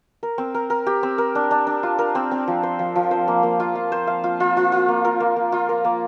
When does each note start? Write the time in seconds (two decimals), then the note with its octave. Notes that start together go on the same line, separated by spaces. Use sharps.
0.23 A#4
0.38 C4
0.54 A#4
0.70 A#4
0.86 G4
1.03 C4
1.18 A#4
1.35 D4
1.51 D4
1.67 D4
1.83 F4
1.98 A#4
2.15 C4
2.31 C4
2.48 F3
2.63 C5
2.79 F3
2.96 F3
3.11 C5
3.28 A#3
3.43 A#3
3.60 F4
3.75 F4
3.92 C5
4.07 F5
4.24 F4
4.40 F4
4.57 F4
4.72 F4
4.88 A#3
5.05 A#4
5.20 A#3
5.36 A#3
5.52 F4
5.69 A#4
5.85 A#3